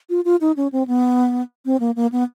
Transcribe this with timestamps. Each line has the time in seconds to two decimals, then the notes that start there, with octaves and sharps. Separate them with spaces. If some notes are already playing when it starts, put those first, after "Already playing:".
0.10 F4
0.25 F4
0.41 D#4
0.57 C#4
0.72 C4
0.87 B3
1.66 C4
1.80 A#3
1.96 A#3
2.12 B3